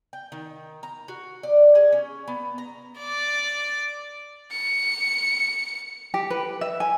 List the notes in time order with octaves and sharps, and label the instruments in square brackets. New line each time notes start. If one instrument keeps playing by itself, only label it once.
[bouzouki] G5
D#3
A#5
F#4
D5
G#4
C#4
B3
A#5
[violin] D5
C#7
[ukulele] G4
B4
E5
G#5